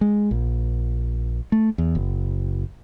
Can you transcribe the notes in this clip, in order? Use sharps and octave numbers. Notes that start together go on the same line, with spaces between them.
G#3
A#1
A3
E2
F#1